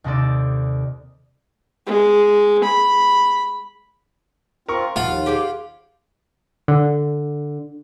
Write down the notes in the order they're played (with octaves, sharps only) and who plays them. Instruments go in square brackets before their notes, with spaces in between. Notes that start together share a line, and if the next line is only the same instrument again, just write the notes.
[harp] D#2 C3 C4 D#4 A4 D5
[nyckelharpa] G#3
B5
[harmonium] C4 F4 [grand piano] A#4 C#6
[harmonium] D#2 [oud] F3 [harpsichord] F4 [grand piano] F#5
[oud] G4 G#4 C5
[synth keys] D3